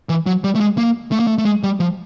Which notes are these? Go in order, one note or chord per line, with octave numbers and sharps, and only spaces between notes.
E3
F#3
G3
A3
G#3
A#3
A3
A#3
A3
A3
G#3
G3
F3